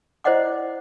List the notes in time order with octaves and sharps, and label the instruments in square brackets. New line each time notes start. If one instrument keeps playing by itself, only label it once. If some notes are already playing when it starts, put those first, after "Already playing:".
[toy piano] E4 C5 D5 D#5 F#5 D6